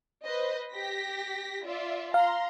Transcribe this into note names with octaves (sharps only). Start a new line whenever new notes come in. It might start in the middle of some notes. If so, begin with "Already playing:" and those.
B4 C5 D#5
G4 A#6 B6
F4 D5 E5
F5 A#5 C6